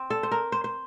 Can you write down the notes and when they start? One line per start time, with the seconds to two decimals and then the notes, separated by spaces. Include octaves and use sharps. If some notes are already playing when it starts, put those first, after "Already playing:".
Already playing: C4
0.10 A4
0.23 C5
0.31 A#4
0.52 C5
0.64 C5